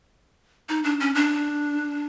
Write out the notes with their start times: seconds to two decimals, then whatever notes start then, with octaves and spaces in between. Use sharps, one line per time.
0.69 D#4
0.84 D4
1.00 C#4
1.15 D4